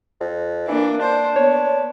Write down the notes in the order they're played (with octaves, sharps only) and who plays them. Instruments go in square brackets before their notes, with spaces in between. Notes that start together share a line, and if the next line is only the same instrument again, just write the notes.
[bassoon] F2
[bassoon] E3 [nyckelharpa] A#3 D4
[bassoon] D4 [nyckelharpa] C5
[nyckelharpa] B3 [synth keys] C#5